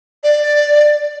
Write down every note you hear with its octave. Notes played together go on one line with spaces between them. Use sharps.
D5